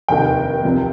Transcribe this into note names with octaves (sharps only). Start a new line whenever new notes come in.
F1 D#2 D#3 G5
C2 C3 F3